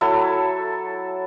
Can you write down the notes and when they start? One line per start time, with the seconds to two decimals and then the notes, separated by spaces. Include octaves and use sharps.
0.01 F#3 E4 A4 E5